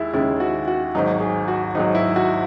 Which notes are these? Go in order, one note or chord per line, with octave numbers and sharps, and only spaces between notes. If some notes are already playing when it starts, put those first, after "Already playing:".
Already playing: D#2 G#3 E4
D#2 C#3 G#3 E4
F#4
F#4
G#1 G#2 F#3 D#4
G#4
F#4
G#1 G#2 F#3 D#4
E4
F#4